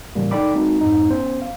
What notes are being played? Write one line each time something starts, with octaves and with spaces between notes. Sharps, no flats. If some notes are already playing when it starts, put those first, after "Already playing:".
A2 C#3 E3 F3 G3 A#3
D#4 A4 D5 G5 B5 D6
G#3 A#3 C4 D#4 F#4
F2 G#2 D#4
B3 C#4 C5
F5